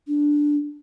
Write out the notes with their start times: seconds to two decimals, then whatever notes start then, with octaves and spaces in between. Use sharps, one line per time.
0.08 D4